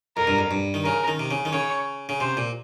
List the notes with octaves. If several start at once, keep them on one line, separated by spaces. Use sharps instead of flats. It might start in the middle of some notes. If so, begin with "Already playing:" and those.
F2 A#4
G2
F2
G2
D#3
C#3 A#4
D#3
C3
C#3
D#3
C#3 C#5
C#3
C3 C5
A#2